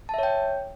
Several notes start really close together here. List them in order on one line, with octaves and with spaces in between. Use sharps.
A5 E5 C#5 G5